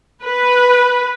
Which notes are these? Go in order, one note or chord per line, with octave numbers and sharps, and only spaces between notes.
B4